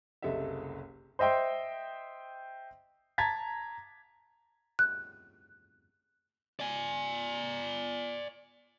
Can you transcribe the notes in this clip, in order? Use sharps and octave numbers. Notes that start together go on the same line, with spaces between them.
F#1 C2 A4 D#5 E5
C5 D#5 E5 G5 C6
A5 A#5 G#6 A6 B6
F#6
D5 G#5